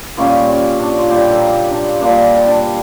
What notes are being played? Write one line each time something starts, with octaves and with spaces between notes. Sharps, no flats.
A#2 G3 A#3 C#4
C#4
D4
F4
A#2 G3 A#3 G4
G4
A4
A#4
D4
A#2 G3 A#3 D4
D4